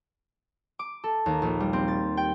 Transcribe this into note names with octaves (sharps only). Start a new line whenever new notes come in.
D6
A4
D#2
A#1
G3
C4
A6
G5